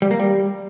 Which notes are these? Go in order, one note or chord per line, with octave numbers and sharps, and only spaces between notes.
G3
A#3
G3